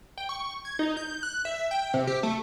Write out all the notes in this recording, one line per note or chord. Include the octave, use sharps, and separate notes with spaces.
G5
C#6
G#6
D#4
G6
F#6
E5
G5
C3
G4
A3